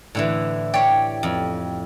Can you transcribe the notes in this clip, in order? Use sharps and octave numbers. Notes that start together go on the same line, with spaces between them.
A2 D3 E3
G4 C#5 D5
F2